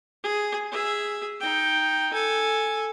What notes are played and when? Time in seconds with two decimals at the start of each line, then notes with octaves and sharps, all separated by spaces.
0.24 G#4
0.72 G#4 E5
1.40 D#4 G5
2.13 A4 G#5